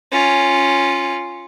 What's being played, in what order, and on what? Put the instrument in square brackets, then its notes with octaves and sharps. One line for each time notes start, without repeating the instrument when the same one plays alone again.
[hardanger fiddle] C#4 F4